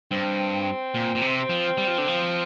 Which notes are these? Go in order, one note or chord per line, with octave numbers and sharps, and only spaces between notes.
G2 C4
A#2
A#2
C3
F3
G3
F3
D3
F3